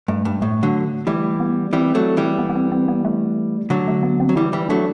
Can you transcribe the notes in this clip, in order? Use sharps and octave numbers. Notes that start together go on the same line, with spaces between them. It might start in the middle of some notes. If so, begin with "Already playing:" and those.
G2 A3
G2
A2 A3
D3 F#3
E3 G3 A3
B3
E3 G3 C4
F#3 A3
E3 G3
B3
B3
C4
C4
B3
A3
D3 F#3
A3
B3
C4
F#3
E3 G3 E4
E3 G3
F#3 A3 D4